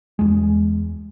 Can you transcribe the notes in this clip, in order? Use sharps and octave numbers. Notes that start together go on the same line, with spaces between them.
E2 G#3